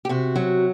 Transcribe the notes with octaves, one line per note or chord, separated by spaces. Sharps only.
G4
C3 F#4
F#3